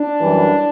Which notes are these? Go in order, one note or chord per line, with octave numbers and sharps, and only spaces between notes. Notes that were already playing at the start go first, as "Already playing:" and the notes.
Already playing: D4
F#2 E3 G3